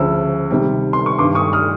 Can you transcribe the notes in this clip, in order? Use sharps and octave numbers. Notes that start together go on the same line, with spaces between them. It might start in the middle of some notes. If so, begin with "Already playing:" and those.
Already playing: D2 C#3 F3 E6
C3 D#3 G3
C6
C#6
G2 D#3 G3 C6 D6
C#6 D#6
D#6 F6